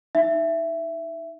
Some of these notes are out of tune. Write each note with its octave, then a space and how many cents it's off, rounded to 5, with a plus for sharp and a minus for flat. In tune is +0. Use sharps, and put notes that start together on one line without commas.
D#4 +0 E5 +15